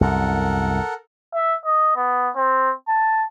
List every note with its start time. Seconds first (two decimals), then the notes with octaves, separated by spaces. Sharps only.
0.01 C2 F#2 A4 A#4 F#5
1.34 E5
1.65 D#5
1.96 B3
2.36 C4
2.88 A5